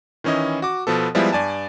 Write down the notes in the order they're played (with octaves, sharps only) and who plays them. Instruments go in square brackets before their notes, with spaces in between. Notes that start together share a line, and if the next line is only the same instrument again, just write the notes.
[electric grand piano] D#3 E3 C#4 E4 D#5
F#4 D6
B2 F3 B3 A4
F3 G3 G#3 B3 E4
G2 D5 G#5 A5